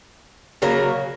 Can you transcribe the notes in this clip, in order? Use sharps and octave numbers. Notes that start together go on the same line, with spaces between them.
C#3 F#3 A#3